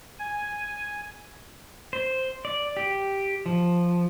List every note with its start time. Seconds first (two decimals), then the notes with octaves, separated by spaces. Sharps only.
0.19 G#5
1.93 C5
2.45 D5
2.77 G4
3.46 F3